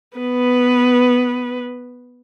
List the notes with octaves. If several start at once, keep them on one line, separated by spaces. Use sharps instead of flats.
B3 B4